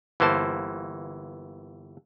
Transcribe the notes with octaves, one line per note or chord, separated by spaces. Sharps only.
G1 E3 A#3 C5 A5